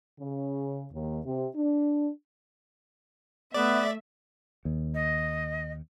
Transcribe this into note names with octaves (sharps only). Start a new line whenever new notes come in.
C#3
D#2
C3
D4
A3 B3 D5 E5
D#2
D#5